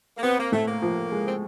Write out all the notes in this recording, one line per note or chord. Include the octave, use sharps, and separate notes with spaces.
A#3
B3 C4
A#3
A2 A3
A#3
F3
G#3
C4